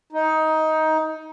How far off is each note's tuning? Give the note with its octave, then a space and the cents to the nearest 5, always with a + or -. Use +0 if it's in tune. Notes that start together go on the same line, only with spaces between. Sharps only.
D#4 +15